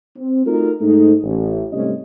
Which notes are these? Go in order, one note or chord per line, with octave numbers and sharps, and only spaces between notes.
C4
A3 D#4 F4 F#4 A4 A#4
G#2 A3 D#4
A1
G#2 C3 G3 A3 C#4 D#5